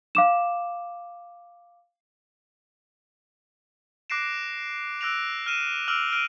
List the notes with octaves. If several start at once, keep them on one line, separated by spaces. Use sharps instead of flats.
F5 D6 E7
D6 F#6 A#6 C7 D7 E7
E6 F#6 A#6 D7 F7
F6 D#7 E7
D6 E6 F6 D7 F7 F#7
F6 D7 D#7